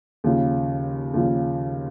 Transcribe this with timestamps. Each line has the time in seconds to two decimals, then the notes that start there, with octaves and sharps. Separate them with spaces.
0.24 D#2 C#3 F3
1.14 D#2 C#3 F3